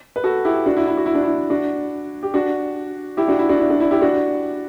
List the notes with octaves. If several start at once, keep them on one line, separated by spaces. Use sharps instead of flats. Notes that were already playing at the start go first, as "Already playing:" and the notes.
B4
F#4 A4
E4 G4
D4 F#4
E4
E4
F#4
E4
D4
E4
D4 F#4
G4
D4 F#4
E4 G4
D4 F#4
E4
D4 F#4
E4
D4
E4
E4 G4
D4 F#4